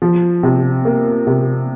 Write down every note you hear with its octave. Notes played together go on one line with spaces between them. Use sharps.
F3
C3
A#3
C3